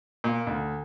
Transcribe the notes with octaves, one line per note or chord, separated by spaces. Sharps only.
A#2
D2